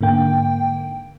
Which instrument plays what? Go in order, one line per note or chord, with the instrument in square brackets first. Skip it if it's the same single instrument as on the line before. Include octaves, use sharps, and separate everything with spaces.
[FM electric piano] G#2 D3 A#3 G5